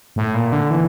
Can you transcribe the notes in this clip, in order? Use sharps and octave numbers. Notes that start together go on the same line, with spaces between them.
A2
A#2
D3
E3